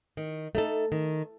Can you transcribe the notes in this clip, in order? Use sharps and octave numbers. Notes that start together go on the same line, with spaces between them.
D#3
A3 D#4 A4
D#3